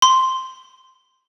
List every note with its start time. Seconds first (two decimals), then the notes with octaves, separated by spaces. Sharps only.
0.02 C6